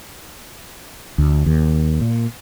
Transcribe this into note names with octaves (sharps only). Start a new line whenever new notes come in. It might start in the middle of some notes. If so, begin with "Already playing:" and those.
D2
D#2
A#2